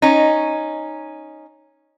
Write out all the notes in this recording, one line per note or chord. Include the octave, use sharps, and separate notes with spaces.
C#4 D#4